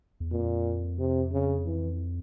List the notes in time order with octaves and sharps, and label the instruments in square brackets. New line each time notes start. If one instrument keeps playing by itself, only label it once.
[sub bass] E2
[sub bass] F2 [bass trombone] A#2
[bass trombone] C3
C#3
E3